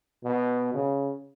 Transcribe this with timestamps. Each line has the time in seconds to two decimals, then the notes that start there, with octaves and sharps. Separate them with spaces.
0.24 B2
0.74 C#3